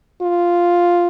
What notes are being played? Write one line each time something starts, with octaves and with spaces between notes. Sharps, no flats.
F4